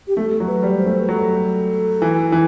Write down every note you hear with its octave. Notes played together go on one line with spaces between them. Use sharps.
G4
A3 A4
F#3
B4
G3
C5
A3
B4
F#3 A4
E3
E3